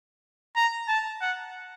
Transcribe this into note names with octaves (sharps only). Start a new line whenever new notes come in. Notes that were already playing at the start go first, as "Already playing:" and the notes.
A#5
A5
F#5